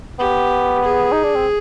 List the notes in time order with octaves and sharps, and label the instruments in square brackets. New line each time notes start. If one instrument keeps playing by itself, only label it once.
[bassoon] B3 [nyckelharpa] G4
[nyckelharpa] G#4
[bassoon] D#4
D4
C4